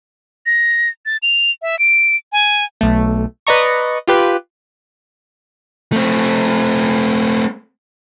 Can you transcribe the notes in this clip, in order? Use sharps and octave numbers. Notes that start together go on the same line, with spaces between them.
A#6
A6
F7
E5
D7
G#5
B1 A3
B4 D5 D#5 A#5 C#6
F4 G4 B4
A3 C4